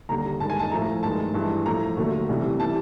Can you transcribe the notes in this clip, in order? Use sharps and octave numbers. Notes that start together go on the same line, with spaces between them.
D#2 D3 G3 A#5
G2 D#3 G#3 A5
G#5
A5
A2 F3 A3 A#5
G2 D#3 G#3 A5
G2 E3 G#3
A2 F3 A3 A#5
D#2 D3 F#3 A3
C2 C3 E3 G3
E3 G3 A5